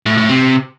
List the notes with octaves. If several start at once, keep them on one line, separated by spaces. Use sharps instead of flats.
A2
A2
C3